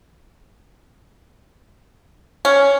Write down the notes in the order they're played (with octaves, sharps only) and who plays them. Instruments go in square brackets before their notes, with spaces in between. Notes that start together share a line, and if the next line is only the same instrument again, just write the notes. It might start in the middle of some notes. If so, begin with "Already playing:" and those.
[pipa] C#4